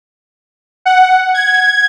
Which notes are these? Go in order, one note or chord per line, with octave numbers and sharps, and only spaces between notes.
F#5
G#6